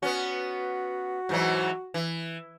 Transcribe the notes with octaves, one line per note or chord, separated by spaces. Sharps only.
B3 C#4 F#4
G#2 E3 F#3
E3